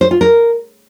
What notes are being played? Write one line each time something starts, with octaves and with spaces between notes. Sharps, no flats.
C5
F4
A#4